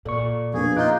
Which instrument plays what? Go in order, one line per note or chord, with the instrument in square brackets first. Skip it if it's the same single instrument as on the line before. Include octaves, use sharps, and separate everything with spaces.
[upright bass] A#2 [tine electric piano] A4 D5 C#6
[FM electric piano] F2 B2 B4 [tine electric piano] A#3 D4 [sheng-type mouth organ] G#4
[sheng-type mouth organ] D#4 F4 [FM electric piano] D6 [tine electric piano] F#6 G6